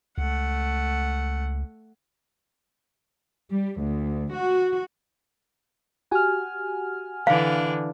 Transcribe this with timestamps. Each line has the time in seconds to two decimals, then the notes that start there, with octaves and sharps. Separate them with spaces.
0.18 C#2 A3 F#5
3.51 G3
3.81 D2
4.33 F#4
6.11 F#4 G4 F#5 G#5 F6
7.27 D3 E3 D4 F5